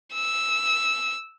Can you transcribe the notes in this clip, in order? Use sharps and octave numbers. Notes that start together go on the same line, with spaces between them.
E6